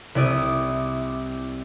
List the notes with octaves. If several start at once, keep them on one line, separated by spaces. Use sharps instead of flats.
C2 E4 D5 D#6